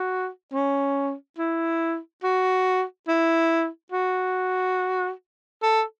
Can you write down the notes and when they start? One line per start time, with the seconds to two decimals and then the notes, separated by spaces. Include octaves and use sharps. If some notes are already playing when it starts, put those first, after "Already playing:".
Already playing: F#4
0.54 C#4
1.38 E4
2.23 F#4
3.08 E4
3.92 F#4
5.62 A4